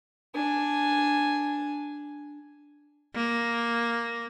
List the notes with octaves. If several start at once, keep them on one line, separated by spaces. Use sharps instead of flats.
D4 G#5
A#3